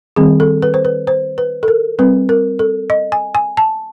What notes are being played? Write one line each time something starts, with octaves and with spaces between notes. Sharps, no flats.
D#3 G3 C4 G#4
A4
B4
C5
B4
C5
B4
A4
A#4
G3 C4 B4
A#4
A4
D#5
G#5
G#5
A5